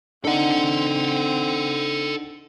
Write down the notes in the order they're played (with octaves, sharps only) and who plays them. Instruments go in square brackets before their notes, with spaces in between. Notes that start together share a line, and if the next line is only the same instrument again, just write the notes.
[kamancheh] C4 [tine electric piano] D4 D#4 [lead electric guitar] A4 F#5